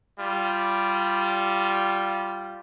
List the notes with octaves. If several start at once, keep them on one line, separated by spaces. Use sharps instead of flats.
G3 F4